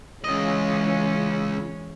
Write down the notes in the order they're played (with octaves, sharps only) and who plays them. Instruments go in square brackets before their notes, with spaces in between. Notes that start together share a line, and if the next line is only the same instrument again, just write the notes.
[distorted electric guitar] C#2 D#5 [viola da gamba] E3 G#3 C#4